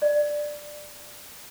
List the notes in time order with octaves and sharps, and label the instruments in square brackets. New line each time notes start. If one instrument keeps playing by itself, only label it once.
[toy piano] D5